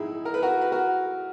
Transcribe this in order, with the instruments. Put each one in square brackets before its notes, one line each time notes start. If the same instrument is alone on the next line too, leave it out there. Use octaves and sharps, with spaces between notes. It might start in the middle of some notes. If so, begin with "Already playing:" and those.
Already playing: [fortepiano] A#1 G#2 D#4 E4 G#4
A#4
B4
F#4 A#4
B4
F#4 A#4